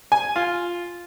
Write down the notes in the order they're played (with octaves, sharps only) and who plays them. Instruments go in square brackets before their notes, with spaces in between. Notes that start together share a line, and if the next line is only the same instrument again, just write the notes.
[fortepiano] G#5
F4